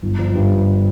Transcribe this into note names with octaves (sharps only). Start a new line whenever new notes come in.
G1
F3
G2